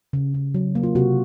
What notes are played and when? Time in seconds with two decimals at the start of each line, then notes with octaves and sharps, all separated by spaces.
0.13 C#3
0.34 C#3
0.54 F#3
0.75 A#3
0.83 F4
0.95 C3 F#4